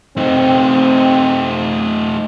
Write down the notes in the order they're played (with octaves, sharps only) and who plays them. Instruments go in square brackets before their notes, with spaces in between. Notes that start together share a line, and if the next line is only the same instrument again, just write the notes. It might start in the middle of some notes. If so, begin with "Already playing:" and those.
[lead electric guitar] A3 D#4 [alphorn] C4